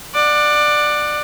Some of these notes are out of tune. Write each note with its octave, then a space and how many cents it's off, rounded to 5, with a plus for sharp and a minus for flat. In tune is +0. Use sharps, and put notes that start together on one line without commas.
D5 +20 F#5 -5